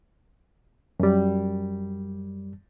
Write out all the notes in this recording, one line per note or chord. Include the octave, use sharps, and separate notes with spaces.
F#2 G3